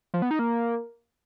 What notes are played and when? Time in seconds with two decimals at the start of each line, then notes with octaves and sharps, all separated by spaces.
0.14 F3
0.22 B3
0.31 D#4
0.39 A#3